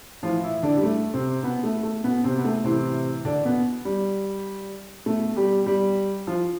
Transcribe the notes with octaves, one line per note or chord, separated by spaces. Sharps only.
A2 E3 F3 F4
E3 E4
D3 D4
G3
A3
C3 C4
B2 B3
A3
A3
B2 B3
C3 C4
B3
A3
A2 C3 E3 C4
D3 D4
B2 B3
G3
B2 A3
G3 G4
G3 G4
F3 F4